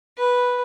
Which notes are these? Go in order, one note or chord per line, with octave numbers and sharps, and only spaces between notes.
B4